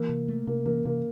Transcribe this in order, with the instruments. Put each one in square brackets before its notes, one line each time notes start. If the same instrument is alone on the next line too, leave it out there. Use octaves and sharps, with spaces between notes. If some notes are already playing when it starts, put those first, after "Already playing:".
Already playing: [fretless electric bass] E3 [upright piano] A#3
[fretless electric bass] C3
A3
[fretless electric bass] C3 [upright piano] A#3
[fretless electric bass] E3 [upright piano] A#3
[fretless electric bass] C3 [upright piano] A#3